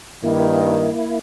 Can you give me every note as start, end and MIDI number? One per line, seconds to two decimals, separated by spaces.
0.24 0.91 43
0.24 0.91 51
0.24 1.19 58
0.24 1.19 64